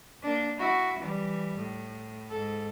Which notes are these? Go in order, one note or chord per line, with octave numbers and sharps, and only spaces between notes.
A#3 D4
E4 F#4
E3 G3
A2
G#2 A4